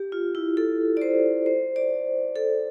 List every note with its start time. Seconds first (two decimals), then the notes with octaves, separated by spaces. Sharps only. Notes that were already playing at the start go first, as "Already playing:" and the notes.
Already playing: G4
0.12 F4
0.35 E4
0.57 A4
0.97 D5
1.02 C5
1.46 C5
1.76 D5
2.36 A4